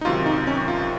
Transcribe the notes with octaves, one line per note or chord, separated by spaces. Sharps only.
D#4
C#2 C3 D#3 F#3 F4
D#4
C#4
F4